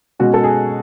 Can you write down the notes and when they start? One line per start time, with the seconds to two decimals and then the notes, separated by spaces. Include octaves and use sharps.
0.19 B2 G#3 C#4 F#4
0.34 A4
0.44 G#4